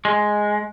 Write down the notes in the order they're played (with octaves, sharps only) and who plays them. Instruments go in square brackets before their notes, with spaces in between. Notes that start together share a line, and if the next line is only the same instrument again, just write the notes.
[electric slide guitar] G#3